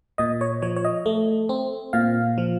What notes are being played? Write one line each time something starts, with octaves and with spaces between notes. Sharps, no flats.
A#2 D#5
C#5
F3 C#5
C#5
D#5
A3
C4
A#2 F5
F3